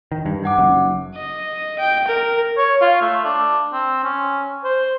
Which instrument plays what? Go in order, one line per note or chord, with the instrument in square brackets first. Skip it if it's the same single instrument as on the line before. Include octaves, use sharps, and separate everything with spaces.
[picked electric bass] D#3
G2
[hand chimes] D#4 F#5 D6
[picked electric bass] F#1 F#2
[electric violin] D#5
G5
A#4
[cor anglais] C#5
F4
A3
D4
C4
C#4
C5